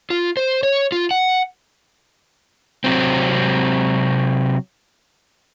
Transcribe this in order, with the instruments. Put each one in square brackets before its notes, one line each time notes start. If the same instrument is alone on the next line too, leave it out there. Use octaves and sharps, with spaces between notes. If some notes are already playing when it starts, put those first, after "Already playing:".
[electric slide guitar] F4
C5
C#5
F4
F#5
C3 F#3 C4